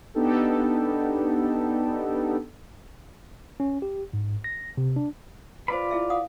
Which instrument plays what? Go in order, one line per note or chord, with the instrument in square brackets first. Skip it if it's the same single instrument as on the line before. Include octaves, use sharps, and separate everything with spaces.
[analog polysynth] B3 D4 D#4 G4 A4
[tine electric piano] C#4
G4
G#2
A#6
C3
D4
[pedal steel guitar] F4 D5 B5 [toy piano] B4 C5
[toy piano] E4 G#4 E5
F5 F#5 D#6